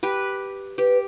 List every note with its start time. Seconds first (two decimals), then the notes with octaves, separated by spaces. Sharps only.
0.03 G4 B4
0.78 G4 B4